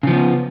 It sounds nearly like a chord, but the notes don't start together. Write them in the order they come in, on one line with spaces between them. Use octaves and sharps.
C#3 F3 B3